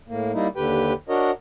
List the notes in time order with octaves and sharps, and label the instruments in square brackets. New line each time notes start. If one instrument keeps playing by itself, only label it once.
[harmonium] A2 A#3
G3 A#3 D#4 E4
D#2 D3 G4 B4 G5
D4 F#4 A#4 C#5 D#5